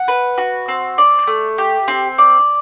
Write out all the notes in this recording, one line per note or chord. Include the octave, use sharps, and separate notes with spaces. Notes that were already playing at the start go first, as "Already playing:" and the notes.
Already playing: F#5
B4
F#4
C4
D5
A3
G4
C4
D5